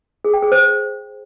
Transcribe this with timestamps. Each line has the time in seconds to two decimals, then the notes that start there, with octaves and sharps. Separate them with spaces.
0.25 G#4
0.34 G5
0.43 G#4
0.52 C5